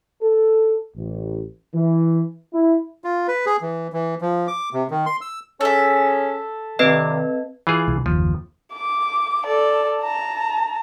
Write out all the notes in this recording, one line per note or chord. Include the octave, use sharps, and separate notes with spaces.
A4
A1
E3
E4
F4
B4
G#4
E3
E3
F3
D6
C3
D#3
C6
E6
C#4 G#4 A4 E5
G2 C3 D#3 C4 B4 D#5
E3 F4 G#4
C2
F#1 D#2 F3
D6
A4 D5
A5 A#5